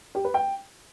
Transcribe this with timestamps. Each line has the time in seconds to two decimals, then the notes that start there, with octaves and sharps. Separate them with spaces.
0.15 G4
0.24 B4
0.34 G5